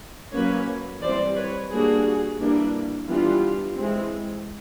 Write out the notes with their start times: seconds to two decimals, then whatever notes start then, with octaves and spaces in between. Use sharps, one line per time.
0.33 F#3 A#3 C#4 B4 C#5
1.02 E3 G3 C4 C5 D5
1.36 B4 C#5
1.70 G3 A#3 D4 F#4 G#4
2.39 E3 G3 A#3 D4
3.07 E3 G3 B3 D4 F4 G4
3.76 E3 G#3 C4